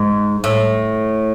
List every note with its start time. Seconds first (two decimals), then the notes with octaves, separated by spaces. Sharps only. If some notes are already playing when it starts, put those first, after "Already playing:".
Already playing: G#2
0.44 A2